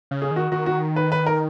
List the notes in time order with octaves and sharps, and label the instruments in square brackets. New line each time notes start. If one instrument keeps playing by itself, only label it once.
[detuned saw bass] C#3
[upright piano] G#4
[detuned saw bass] D#3
[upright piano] F#4
[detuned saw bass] D#3 [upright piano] F#4
[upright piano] F#4
B4
B4
A#4